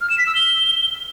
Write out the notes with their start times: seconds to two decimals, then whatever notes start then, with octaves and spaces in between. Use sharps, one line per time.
0.01 F6
0.10 E7
0.18 B6
0.27 E6
0.35 G7